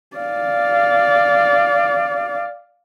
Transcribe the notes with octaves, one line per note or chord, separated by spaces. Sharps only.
D5 F5